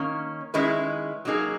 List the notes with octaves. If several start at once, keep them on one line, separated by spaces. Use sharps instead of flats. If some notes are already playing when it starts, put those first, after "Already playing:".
Already playing: D#3 A#3 C#4
D#3 G#3 C#4 E4 B4
F#3 A#3 D#4 G#4